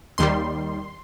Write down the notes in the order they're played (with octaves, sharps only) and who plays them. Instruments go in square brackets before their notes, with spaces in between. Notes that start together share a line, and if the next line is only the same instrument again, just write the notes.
[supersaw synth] D#2 D#3 G3 C6